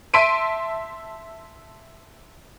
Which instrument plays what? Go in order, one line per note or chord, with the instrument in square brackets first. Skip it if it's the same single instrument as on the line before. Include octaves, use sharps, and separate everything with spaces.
[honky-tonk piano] E5 A5 C6 B6 D7 D#7